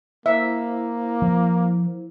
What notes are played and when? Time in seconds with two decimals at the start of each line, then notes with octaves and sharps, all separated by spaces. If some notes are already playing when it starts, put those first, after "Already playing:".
0.26 A#3 E4 C5 E5
1.22 F3